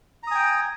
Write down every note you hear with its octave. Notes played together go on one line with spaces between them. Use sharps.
G5 G#5 A#5 D#6